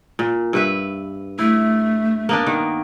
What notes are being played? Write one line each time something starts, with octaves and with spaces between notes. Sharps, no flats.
A#2
G2 B4 E5
A3 E4
A#3 B3 D4
D#3